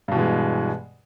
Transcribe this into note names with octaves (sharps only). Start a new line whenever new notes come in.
G2 B2 E3 G#3